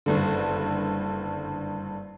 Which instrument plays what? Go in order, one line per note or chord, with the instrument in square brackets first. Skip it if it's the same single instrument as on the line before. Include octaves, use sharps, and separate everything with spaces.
[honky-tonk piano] F#1 G2 D3